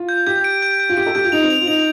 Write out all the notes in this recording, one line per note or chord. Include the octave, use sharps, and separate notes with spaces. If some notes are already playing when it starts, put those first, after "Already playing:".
Already playing: F4
G6
G4 G6
D7
G6
G6
F4
G4 D7
A4
G4 G6
F4
D#4 F7
C4
F7
F4
D#4 F7